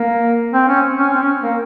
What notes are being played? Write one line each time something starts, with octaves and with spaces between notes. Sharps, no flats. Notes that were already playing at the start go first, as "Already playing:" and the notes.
Already playing: A#3
C4
C#4
C#4
C4
C#4
A#3